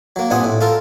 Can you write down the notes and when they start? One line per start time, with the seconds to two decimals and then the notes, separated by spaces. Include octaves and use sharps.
0.16 F#3 A#3
0.30 G2 A#2 C4 F#5 G#5 D#6
0.44 A2
0.61 F4 A4 A#4